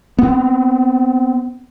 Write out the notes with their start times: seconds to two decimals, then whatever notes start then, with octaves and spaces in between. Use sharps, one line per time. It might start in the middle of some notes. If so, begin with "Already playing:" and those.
0.19 B3 C4